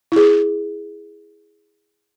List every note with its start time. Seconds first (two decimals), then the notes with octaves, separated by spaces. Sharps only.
0.12 E4 G#4